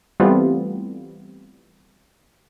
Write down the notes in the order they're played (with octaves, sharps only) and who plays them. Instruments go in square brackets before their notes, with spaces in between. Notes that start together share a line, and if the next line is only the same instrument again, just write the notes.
[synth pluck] E3 G3 A3 B3 C4 F4